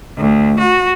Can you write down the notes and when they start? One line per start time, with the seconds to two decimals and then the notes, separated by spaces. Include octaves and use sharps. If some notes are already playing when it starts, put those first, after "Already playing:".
0.17 D2
0.58 F#4